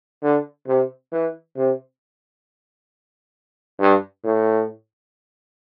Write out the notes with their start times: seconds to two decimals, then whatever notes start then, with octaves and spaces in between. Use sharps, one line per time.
0.23 D3
0.67 C3
1.12 E3
1.56 C3
3.79 G2
4.24 A2